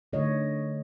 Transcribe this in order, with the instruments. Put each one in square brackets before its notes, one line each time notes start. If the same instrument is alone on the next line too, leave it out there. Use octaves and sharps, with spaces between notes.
[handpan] D3 A3 C#5 D#5